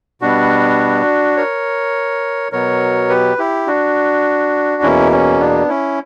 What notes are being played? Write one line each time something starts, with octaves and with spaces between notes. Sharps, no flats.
B2 G3 B3 D4 F#4
A#4 C#5
B2 F#3 B3 A#4 C#5
G4 B4
E4 G4
D4 F#4
E2 B2 A#3 C#4 E4
C#4
B3 D4
C#4 E4